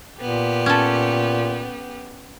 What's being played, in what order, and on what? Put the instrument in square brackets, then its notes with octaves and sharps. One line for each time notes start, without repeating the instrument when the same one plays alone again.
[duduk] A#2 [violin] B3 G4
[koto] C#4 A4